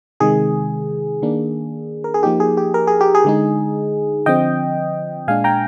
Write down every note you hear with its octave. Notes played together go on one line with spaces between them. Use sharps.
C3 D#3 G#3 G#4
D#3 A#3 D4
A#4
G#4
F3 A#3 D#4 G4
G#4
G4
A#4
G#4
G4
G#4
D3 G#3 D#4
D3 F3 C4 D#5 G5
A#2 G#3 D4 F5 G#5
G5 A#5